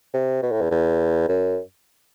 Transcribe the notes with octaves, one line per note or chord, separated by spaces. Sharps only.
C3
B2
A2
E2
E2
F#2